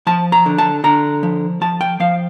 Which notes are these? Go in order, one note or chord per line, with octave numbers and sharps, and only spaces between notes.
F3 A5
A#5
D3
A5
D3 A#5
F3
F3 A5
G5
F3 F5